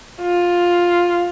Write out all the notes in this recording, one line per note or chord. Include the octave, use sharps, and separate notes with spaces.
F4